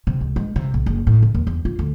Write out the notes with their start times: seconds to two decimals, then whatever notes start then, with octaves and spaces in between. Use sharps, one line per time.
0.07 C3
0.21 C#2
0.36 G#3
0.56 C3
0.74 B1
0.86 F#1
1.07 A2
1.23 C2
1.34 D#2
1.47 E2
1.65 F4
1.79 D2